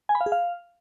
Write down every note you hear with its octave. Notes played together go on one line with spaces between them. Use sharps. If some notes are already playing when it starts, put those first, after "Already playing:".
G#5
B5
F5
G#4
F5